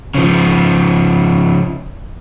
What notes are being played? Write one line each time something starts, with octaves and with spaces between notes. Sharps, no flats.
C#3 F3